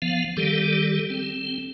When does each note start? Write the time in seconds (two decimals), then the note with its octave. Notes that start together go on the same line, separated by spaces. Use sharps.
0.02 F3 B3 F5
0.37 D#3 G3 G4 A4
1.10 C4